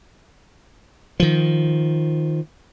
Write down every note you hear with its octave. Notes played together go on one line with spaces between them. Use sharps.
D#3 F3